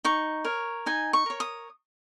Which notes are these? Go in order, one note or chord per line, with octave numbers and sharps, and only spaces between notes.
D#4 C#6
A#4 C#5
D#4 G#5
C#6
A#4 C#5
D#6